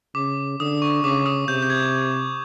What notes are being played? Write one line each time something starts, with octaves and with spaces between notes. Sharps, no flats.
C#3 D6
D3 D#6
C#6
C#3 D6
D#6
C3 G6
G6
G#6